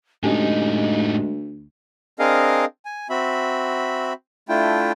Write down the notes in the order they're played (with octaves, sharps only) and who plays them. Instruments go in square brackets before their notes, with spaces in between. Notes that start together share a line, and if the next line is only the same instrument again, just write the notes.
[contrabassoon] D2 [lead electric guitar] A2 D#4 [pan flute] G#3 [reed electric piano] C#4 G4 G#5
[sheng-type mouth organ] C4 D4 G#4 A#4 D#5 F5
G#5
C4 F#4 E5 B5
A3 D4 E4 F4 G5